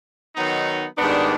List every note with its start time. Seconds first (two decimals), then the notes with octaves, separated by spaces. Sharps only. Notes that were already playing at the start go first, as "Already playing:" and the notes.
0.36 D#3 F#3 B3 D#4
0.98 G#2 D#3 G3 B3 D4